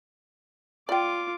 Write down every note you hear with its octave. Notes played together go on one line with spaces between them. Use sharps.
F4 D5 G5 D6